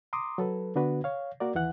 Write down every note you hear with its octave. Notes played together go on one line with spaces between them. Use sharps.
A#5 C6 D6 D#6
F#3 A4 B4
D3 B3 D4 F#4 B4
C#5 F5
A#3 F#4 A#4 D5
D#2 E3 F#5 F#6